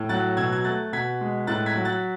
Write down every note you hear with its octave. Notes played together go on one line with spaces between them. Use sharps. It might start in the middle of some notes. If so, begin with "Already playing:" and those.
Already playing: A2
F#3 F#6 A6
B2 E6 G#6
G#6
A3 F#6 A6
B2 G#6 B6
G#3
A2 F#6 A6
G#6 B6
F#3
F#6 A6